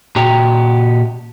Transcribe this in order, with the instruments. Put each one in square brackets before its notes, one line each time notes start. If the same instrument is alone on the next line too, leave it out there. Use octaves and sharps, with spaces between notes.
[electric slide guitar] A#2 F#4 G4 A#5